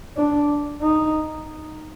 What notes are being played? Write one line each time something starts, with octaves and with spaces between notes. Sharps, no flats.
D4
D#4